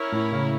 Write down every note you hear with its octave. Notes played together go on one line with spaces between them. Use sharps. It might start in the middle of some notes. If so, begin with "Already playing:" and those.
Already playing: C#4 E4 A#4 C#5
A2
C#3